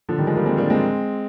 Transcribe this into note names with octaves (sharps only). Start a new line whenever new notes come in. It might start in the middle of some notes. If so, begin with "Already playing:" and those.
D3 F3
D#3 G3
F3 G#3
G3 A#3
G#3 C4
A#3 D4
G#3 C4